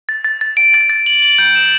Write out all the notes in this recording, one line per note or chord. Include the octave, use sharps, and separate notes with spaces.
A6
A6
A6
D7
A6
A6
F#7
F#7
G6
E7